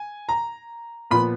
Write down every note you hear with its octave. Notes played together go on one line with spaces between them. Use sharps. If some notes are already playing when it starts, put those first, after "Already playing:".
Already playing: G#5
A#5
A#2 F3 B3 B5